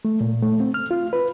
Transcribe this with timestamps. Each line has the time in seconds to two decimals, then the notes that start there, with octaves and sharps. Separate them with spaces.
0.05 A3
0.21 A#2
0.42 A3
0.60 C4
0.74 F6
0.91 F4
1.13 B4